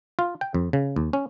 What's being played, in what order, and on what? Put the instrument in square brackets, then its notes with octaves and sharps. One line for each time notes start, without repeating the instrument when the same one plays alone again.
[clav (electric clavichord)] F4
G5
F2
C#3
D#2
C#4